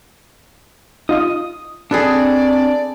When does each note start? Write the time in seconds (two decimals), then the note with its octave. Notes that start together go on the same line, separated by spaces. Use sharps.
1.09 D#4 F4 D#5 D#6
1.91 C4 D4 G#4 A4 B4 D5